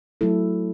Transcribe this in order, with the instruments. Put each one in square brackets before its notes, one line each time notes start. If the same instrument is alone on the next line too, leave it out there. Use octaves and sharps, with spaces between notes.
[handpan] F#3 A3 E4 A4